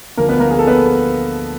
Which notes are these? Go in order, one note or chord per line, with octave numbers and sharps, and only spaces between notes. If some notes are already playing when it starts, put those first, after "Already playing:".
D2 D3 F3 A#3 A#4
B3 B4
A#3 A#4
G#4
A4
B3 B4